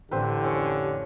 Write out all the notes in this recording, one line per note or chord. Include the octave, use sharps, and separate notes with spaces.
A1 A2 D3 C4 G4 B4
F2 C#4 C#5